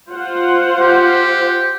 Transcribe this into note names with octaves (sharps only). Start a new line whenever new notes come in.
F4 C5 F#5
G4